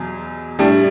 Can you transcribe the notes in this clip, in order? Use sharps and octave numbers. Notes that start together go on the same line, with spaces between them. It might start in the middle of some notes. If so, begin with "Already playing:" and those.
Already playing: E2 B2 F#3
A2 G3 D4